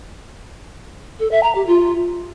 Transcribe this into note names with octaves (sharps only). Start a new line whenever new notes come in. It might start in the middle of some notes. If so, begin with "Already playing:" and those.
A4
E5
A#5
G4
F4